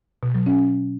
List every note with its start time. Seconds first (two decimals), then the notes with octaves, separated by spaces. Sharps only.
0.23 B2
0.35 F#3
0.46 C#4